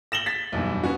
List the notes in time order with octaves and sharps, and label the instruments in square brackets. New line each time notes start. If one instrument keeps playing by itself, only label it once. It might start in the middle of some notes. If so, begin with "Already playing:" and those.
[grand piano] A#6 E7 F#7 G7
A6 B6
B1 E2 G2
B3 C#4 F#4